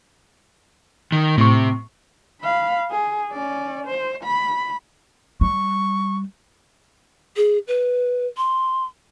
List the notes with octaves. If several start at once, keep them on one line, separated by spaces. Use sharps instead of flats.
D#3
A2 C3 C#6
F5 B5
G#4
C#4 D5
C5
B5
G3 C#6
G#4
B4
C6